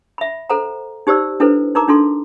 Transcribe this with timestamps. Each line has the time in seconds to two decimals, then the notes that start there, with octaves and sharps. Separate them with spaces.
0.18 E5 B5
0.50 A4 C5 F#5 A#5
1.07 D#4 G4 C5 D5 E6
1.40 D4 E4 A4 B4 C5
1.75 D#4 A#4 A#5 D6
1.88 D4 D#4 F4 A4 C6